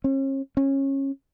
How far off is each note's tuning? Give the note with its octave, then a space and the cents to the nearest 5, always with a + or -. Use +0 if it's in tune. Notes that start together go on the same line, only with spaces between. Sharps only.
C#4 -40
C#4 -20